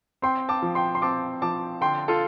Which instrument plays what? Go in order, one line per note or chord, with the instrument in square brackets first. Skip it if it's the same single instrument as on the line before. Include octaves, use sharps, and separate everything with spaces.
[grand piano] C4 G5 C6
A5 D6
F3
G5 C6
C6
C4 A5 D6
F3 A5 D6
D3 G5 C6
F4 A4